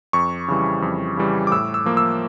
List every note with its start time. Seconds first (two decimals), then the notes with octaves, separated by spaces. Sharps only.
0.13 F2 C#6
0.48 C#3 E3 G3
0.82 F2
1.17 C#3 E3 G3
1.47 D6
1.51 A2 E6
1.74 E6
1.86 F3 A#3
1.97 E6